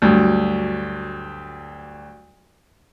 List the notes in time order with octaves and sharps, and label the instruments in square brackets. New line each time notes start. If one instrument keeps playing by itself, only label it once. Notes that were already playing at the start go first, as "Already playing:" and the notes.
[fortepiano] D2 G2 F#3